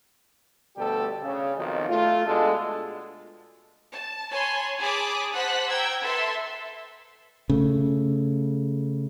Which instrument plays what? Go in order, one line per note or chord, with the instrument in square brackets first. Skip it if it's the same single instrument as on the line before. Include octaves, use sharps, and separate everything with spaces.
[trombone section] D2 B2 G3 G4 A4
C#3
B1 F2 B2 D#3
A3 F4
B2 G#3 D4 A4
[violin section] A5
C#5 G#5 A5 B5 C6
G#4 G#5 A5 B5 D6 D#6
C5 F#5 A5 F#6 B6
G5 A#5 E6 G#6
A4 B4 E5 C6
[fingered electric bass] C#3 A3